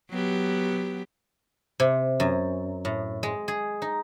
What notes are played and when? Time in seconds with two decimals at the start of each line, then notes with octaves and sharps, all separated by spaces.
0.10 F#3 B3 G4
1.80 C3
2.20 F#2
2.85 A2
3.23 G#3
3.48 G#4
3.82 D#4